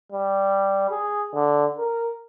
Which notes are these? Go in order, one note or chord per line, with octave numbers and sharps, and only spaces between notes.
G3
G#4
D3
A#4